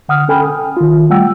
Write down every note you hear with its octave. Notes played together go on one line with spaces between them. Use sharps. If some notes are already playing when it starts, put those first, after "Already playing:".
D3 F#5 D#6 F6
C#4 A4 G5 G#5 B5 F6
D#6
D#3 F4
G3 A3 F#5 G5 E6